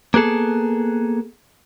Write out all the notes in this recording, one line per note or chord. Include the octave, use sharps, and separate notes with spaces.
A#3 B3 G#4 A4